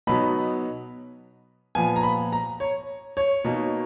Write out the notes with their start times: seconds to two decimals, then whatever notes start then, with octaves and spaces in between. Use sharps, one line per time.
0.07 B2 F#3 B3 D#4 B5
1.75 A#2 F3 B3 G#5
1.96 A#5
2.03 B5
2.32 A#5
2.60 C#5
3.17 C#5
3.44 B2 A#3 D#4